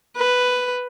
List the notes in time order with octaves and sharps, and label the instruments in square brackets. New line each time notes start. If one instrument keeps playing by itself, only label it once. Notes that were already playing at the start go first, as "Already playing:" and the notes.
[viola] B4